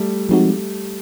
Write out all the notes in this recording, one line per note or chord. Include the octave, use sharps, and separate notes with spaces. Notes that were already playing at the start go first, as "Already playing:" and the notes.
Already playing: G3 A3
F3 G#3 C4 D#4 F#4